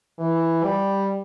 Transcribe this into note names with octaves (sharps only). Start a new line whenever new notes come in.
E3
G3